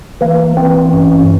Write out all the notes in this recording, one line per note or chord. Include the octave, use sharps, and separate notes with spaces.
E3 A#3
E3 C4
G2 C#4